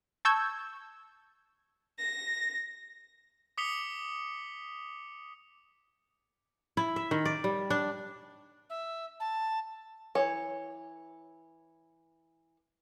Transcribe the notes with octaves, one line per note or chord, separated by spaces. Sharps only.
A5 C#6 E6 G6 G#6
A#6
D6 D#6 B6 C#7 F7 G7
E4
E5
D#3
D5
G3
D4
E5
A5
E3 C#5